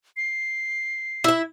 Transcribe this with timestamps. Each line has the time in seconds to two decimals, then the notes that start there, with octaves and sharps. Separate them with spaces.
0.17 C7
1.24 E4 E5